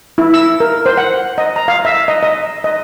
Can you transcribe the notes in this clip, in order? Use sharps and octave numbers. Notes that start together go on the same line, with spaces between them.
E4
E6
A#4
C5
F#5
D#5
A#5
F5
E5
D#5
D#5
D#5